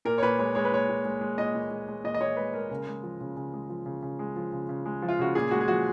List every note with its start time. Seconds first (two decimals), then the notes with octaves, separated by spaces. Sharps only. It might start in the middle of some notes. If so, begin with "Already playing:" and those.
0.05 A#2 A#4
0.18 C#5
0.22 A#2 B4
0.39 G#3 C#5
0.55 G#3 C#5
0.65 B4
0.72 A#2 C#5
0.89 A#2
1.05 G#3
1.21 G#3
1.38 A#2 D#5
1.54 A#2
1.71 G#3
1.88 G#3
2.04 A#2 D#5
2.14 D#5
2.20 A#2 C#5
2.37 G#3 B4
2.54 G#3 A#4
2.70 C#3 A#4
2.87 G#3
3.03 F3
3.21 C#3
3.36 C#3
3.54 G#3
3.69 F3
3.86 C#3
4.02 C#3
4.19 G#3
4.36 F3
4.52 C#3
4.69 C#3
4.86 G#3
5.02 F3
5.09 F4
5.19 C#3 F#4
5.35 A#2 G#4
5.51 G#3 F#4
5.61 G#4
5.68 F3 F#4